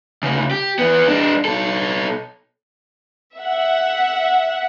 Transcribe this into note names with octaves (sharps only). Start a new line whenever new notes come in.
D2 C#3
G4
E3 B3
G#3 D4
B2 A4
E5 F#5